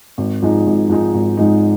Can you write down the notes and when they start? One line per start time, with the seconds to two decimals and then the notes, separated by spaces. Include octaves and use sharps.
0.18 G#1
0.42 G#2 F3 G#3 D#4
0.67 G#1
0.89 G#2 F3 G#3 D#4
1.14 G#1
1.37 G#2 F3 G#3 D#4